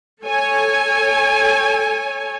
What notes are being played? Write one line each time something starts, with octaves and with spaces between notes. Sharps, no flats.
A4 C#5 G#5